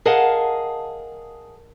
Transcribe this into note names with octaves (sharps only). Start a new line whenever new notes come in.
G#4 A#4 D#5 F5 F#5 A5